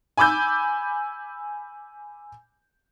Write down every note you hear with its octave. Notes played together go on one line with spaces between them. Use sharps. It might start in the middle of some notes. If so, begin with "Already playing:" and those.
G#5 B5 D6 E6 G6